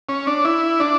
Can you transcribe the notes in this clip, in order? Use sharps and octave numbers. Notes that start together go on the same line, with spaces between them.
C#4
D4
E4
D4